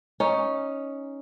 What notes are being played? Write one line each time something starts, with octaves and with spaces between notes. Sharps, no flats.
C#4 D#4